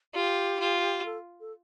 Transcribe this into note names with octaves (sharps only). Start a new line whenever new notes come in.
F4 G4
F4
A4
A4